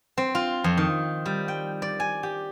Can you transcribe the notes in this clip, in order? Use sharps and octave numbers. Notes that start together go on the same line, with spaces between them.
C4
F4
F2
D#3
G3
G5
D5
G#5
G4